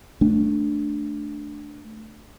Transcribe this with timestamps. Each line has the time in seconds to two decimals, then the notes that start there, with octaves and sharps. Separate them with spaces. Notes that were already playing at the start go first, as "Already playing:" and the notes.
0.21 A3 D4